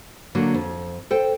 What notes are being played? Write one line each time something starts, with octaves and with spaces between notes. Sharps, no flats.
D3 F#3 A#3
F2
A4 C5 G5